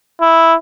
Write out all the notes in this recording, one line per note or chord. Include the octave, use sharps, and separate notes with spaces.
E4